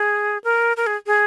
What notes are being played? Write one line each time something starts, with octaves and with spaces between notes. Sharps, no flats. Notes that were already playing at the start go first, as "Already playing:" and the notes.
Already playing: G#4
A#4
A#4
G#4
G#4